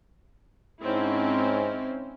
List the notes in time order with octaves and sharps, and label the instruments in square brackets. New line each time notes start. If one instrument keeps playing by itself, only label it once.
[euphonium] G#2 [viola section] C4 C#4 E4